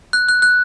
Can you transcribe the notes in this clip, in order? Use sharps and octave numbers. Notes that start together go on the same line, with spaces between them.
F#6
F#6
F#6